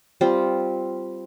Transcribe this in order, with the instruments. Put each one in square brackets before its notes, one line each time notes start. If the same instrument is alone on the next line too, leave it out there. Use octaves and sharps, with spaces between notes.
[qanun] G3 C4 F4